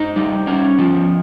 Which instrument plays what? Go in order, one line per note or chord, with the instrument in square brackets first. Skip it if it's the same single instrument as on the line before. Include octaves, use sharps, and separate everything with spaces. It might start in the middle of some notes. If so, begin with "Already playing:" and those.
Already playing: [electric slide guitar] D#4 C5
G3
C#4
F3